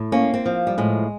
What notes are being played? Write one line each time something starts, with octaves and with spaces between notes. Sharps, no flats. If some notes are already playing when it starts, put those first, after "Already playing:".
Already playing: A2
A#3 C#4
C4
F3
G3
A2 G#3